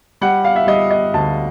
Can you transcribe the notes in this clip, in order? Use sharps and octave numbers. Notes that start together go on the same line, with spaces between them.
G3 F#5
F5
E5
G3 D#5
D#5
D2 A5